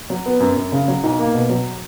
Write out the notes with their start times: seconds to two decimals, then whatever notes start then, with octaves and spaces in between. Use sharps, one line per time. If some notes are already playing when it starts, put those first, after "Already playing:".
0.10 F#3
0.26 B3
0.40 F#2
0.56 F#2
0.72 C#3
0.88 F#3
1.04 B1
1.19 A#3
1.34 B2
1.49 F#3